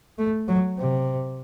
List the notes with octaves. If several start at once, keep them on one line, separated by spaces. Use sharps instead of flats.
A3
F#3
C3